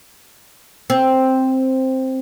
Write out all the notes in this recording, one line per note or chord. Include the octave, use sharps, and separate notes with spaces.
C4